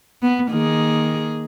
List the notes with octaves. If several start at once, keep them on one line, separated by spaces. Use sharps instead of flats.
B3
D#3 A#3 G#4